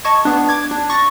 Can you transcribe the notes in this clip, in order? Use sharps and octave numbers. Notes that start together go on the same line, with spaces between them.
D#5 A5 C#6 G#6
B3 D4
D6 G#6
D4
C#6 A6 A#6